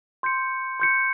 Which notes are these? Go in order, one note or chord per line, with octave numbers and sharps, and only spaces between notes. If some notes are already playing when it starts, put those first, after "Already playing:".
C6 G6 C#7
C6 G6 C#7